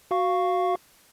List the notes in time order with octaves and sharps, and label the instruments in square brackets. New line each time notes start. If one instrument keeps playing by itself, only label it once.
[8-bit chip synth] F#4 F5 C#6